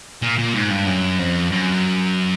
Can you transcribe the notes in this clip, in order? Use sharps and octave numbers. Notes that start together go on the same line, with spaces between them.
A#2
A#2
G#2
G2
F#2
F2
F#2